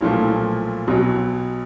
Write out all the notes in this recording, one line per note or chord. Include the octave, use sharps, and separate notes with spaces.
B1 A#2 F3 A3
B1 B2 F#3